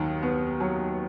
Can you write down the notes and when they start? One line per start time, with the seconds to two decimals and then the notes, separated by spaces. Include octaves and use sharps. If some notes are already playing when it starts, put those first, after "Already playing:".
Already playing: D#2 D#3 F#3
0.23 B3
0.60 F#3